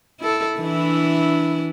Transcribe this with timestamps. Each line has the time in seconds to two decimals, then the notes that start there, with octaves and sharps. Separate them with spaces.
0.21 E4 A4
0.60 E3 D4 E4